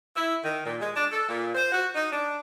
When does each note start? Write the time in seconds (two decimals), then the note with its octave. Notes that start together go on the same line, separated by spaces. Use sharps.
0.16 E4
0.42 D#3
0.64 A#2
0.80 G#3
0.95 D4
1.10 A4
1.28 A#2
1.55 C5
1.72 F#4
1.95 D#4
2.12 D4